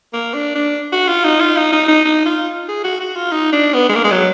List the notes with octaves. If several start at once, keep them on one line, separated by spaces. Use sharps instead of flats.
A#3
D4
D4
F#4
F4
D#4
F4
D#4
D#4
D#4
D#4
F4
G#4
F#4
F#4
F4
D#4
D4
B3
G#3
A#3
G#3
F#3